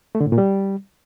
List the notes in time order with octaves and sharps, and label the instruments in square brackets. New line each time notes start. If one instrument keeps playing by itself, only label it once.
[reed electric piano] A3
D3
A2
A#2
G3